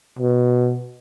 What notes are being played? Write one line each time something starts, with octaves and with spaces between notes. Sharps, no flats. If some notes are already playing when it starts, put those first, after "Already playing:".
B2